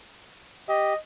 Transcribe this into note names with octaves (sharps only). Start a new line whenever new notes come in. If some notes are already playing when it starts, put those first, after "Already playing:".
G4 D#5